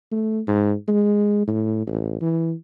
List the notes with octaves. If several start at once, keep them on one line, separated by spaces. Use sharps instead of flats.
A3
G#2
G#3
A2
A1
E3